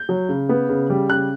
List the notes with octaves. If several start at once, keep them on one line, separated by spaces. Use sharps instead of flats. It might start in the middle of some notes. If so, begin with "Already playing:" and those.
Already playing: G6
F#3
C#3
B3
C#3
G3
C#3 F#6